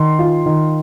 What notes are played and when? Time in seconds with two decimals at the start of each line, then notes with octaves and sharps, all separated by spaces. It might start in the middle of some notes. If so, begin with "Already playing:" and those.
Already playing: D#3 C6
0.19 F4
0.46 D#3